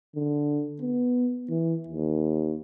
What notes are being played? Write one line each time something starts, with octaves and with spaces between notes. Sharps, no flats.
D3
B3
E3
D#2